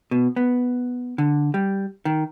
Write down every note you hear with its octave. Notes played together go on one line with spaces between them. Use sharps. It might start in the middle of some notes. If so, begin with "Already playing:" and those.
B2
B3
D3
G3
D#3